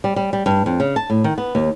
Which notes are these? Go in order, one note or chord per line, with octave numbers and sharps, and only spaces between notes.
G3
G3
G3
G2
F2
C#3
A5
A2
D#3
B3
D#2